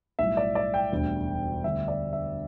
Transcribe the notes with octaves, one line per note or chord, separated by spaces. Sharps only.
B1 A2 G3 E5
D5
D5
G5
E1 D2 D3 G3
D2 D3 G3 E5
D5
E5